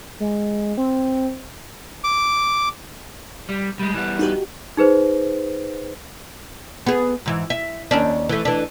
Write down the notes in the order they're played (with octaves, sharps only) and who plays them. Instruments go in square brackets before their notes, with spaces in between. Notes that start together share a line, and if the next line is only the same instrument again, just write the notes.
[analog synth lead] G#3
C4
[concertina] D6
[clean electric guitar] G3
G3 G#3
E3 G3 B3
[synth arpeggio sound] D#4 F#4 G4
[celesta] D#4 G#4 B4 C5
[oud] B3 G#4
G#2 E3
E5
D#2 C#4 D4
E3 A3
E3 D4